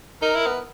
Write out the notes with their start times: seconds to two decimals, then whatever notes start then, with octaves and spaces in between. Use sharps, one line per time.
0.22 D#4 A#4
0.35 E4
0.46 B3